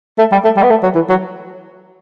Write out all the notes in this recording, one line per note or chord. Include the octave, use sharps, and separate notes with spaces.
A3
G3
A3
G3
B3
A3
F#3
E3
F#3